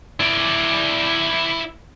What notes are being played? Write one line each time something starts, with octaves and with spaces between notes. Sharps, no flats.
E4 D5